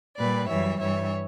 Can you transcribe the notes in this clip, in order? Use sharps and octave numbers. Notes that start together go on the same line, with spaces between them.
A#2 G3 B4 D5
F#2 E3 G3 C#5 E5
G2 E3 G3 C#5 E5